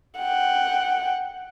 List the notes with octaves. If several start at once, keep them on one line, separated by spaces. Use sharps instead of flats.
F#5 G5